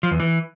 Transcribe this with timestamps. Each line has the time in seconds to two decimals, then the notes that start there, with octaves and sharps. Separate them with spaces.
0.03 F3
0.11 E2
0.20 E3